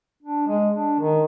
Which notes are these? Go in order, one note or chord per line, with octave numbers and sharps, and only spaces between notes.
D4
G#3
D4
D#3